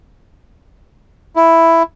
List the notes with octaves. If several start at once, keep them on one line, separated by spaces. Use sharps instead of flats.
E4